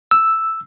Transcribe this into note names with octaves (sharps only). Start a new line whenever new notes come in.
E6